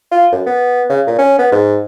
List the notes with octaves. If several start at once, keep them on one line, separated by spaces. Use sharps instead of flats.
F4
F#2
B3
C#3
A#2
C#4
B3
G#2